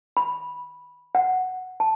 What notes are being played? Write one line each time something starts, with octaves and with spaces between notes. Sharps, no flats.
B5
F#5
A5